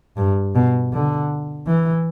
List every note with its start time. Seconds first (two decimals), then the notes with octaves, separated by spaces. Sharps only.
0.17 G2
0.55 B2
0.93 D3
1.67 E3